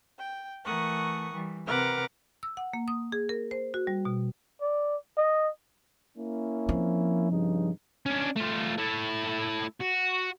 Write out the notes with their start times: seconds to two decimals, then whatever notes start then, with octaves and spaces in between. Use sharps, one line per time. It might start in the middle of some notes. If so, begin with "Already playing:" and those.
0.18 G5
0.63 E3 A3 A#4 F#5 C#6 D#6
1.33 E3 G3
1.66 C3 A#4 B4 F#5 D6 F6
2.43 E6
2.57 F#5
2.73 A#3
2.88 D#6
3.12 G#4
3.29 A#4
3.51 C5
3.74 F#4
3.87 G3
4.05 B2
4.61 D5
5.17 D#5
6.18 A#3 C#4 E4
6.69 F3 C4
7.32 G2 C#3 D#4
8.06 C#4 D4
8.36 A3 F4
8.78 A3 E4
9.81 F#4